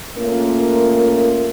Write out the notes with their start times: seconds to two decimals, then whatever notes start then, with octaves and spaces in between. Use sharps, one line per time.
0.18 A3 A#3 C#4 F4 A#4